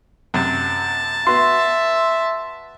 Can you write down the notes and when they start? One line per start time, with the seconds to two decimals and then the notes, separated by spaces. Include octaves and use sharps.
0.34 F#2 C3 A5
1.27 B3 F#4 E5 C6